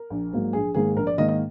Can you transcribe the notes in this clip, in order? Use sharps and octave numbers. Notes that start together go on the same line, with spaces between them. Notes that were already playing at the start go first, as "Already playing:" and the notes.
Already playing: A#4
A#1
G#2 F#3 A#3
A#1 G#4
G#2 D#3 A#3 G#4
A#1 A#4
D5
G#2 D#3 A#3 D#5
D#5